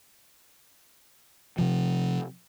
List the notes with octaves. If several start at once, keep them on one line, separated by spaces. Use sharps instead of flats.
C3 F3